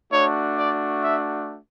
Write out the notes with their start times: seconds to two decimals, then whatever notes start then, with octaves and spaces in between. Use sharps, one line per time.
0.12 A3 D4 F#4 C#5
0.58 D5
1.03 E5